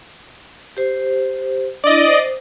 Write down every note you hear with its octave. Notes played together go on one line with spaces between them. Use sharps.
G4 C5
D4 E4 D5 D#5
C5